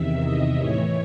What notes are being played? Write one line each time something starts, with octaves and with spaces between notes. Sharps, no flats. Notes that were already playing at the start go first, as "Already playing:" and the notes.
Already playing: E2 C3 D#3 E5
D#5
A2 E3 C#5